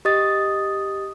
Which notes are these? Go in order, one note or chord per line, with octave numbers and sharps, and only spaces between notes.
G4 D#5 D#6 A6